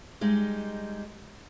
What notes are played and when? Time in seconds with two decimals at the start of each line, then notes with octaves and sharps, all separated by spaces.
0.21 G3 G#3 D#4